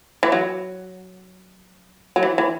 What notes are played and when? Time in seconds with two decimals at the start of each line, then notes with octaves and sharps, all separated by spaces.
0.23 E3
0.32 F#3
2.16 F#3
2.23 E3
2.38 E3